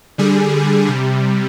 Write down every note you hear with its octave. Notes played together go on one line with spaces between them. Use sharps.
D3 G3 G#4
C3 G3